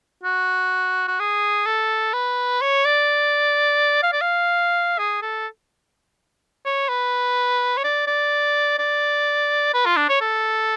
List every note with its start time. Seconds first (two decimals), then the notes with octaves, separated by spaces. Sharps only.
0.23 F#4
1.08 F#4
1.20 G#4
1.66 A4
2.13 B4
2.61 C#5
2.85 D5
4.03 F5
4.13 D5
4.21 F5
4.99 G#4
5.22 A4
6.65 C#5
6.89 B4
7.77 C#5
7.84 D5
8.07 D5
8.79 D5
9.74 B4
9.86 F4
9.97 D4
10.09 C#5
10.21 A4